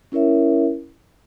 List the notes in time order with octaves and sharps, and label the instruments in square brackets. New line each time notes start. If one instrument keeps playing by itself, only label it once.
[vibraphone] C#4 E4 A#4 C#5 E5